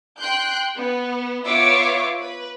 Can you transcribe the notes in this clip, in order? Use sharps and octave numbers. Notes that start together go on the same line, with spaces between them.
G5 C6 F#6 G6
B3
B3 F4 C#5 E5 D6
B4